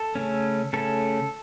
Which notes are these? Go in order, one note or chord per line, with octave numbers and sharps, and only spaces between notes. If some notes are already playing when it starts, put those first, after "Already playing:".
Already playing: A4
C#3 A3 C#4
C#3 A3 C#4 A4